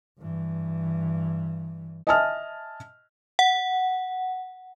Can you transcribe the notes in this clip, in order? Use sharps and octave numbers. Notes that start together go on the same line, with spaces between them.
G2 E3
D#5 E5 G#5 A5 D#6 F6
F#5